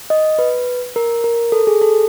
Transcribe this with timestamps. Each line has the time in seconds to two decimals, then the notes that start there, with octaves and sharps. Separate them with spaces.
0.10 D#5
0.39 B4
0.96 A#4
1.24 A#4
1.52 A4
1.67 G#4
1.82 A4